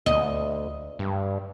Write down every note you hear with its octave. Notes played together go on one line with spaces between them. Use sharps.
D2 D#5
G2